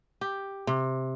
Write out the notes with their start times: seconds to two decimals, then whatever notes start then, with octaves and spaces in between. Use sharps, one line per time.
0.21 G4
0.67 C3